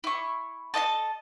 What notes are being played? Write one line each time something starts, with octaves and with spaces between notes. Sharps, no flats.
E4 C#6
A4 D#5 F5 A5